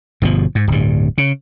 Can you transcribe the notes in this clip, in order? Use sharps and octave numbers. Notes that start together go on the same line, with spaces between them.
G1 B2 D#3 F3
G#2
D1 G2
C#3